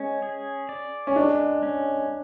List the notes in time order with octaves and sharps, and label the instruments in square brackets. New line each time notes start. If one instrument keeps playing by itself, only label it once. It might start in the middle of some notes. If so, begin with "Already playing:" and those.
Already playing: [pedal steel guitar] G#3 C#4
G#4
D5
[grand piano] C#4
[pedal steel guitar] G#3 [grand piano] D4
[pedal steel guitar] C#4